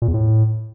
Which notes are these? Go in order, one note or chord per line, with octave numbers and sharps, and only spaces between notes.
A#2
E2
A2